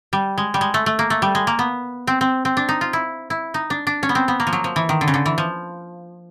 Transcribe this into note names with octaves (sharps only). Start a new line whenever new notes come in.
G3
G#3
G3
G#3
A3
A3
A#3
A3
G3
G#3
A#3
B3
C4
C4
C4
D4
D#4
F4
E4
E4
D#4
D4
D4
C#4
B3
C4
B3
A#3
F3
F#3
F3
E3
D#3
D3
C#3
D3
E3
F3